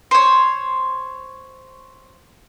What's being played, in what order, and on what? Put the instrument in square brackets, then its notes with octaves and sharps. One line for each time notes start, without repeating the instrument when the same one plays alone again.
[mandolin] C5 C#5